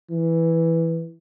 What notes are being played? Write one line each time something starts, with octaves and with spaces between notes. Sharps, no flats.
E3